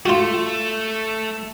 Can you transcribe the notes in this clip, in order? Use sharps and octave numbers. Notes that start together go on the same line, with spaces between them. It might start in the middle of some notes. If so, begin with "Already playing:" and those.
A3 F4 F#4